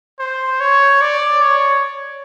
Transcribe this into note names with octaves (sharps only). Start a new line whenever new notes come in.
C5
C#5
D5
C#5